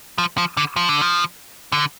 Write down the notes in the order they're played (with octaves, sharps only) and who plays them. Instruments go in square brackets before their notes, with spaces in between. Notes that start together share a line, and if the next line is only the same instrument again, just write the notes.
[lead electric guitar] F3
F3
D3
F3
D3
F3
D3